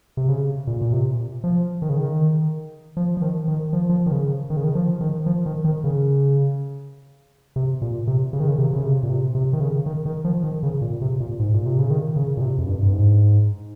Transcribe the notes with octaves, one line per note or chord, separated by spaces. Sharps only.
C3
C#3
A#2
A#2
C3
F3
D#3
C#3
D#3
F3
F3
D#3
D#3
F3
F3
D#3
C#3
D#3
C#3
D#3
F3
D#3
F3
D#3
D#3
C#3
C3
A#2
C3
C#3
D#3
C#3
C3
C#3
C3
A#2
C3
C3
D#3
C#3
D#3
D#3
F3
D#3
C#3
A#2
C3
A#2
G#2
A#2
C3
C#3
D#3
C#3
A#2
C3
F2
G2
G2
G#2